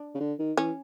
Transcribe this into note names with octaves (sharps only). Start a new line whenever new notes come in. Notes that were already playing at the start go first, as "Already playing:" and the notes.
Already playing: D4
C#3
D3
D#3
E3 C#4